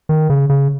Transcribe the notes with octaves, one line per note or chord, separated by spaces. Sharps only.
D#3
C#3
C#3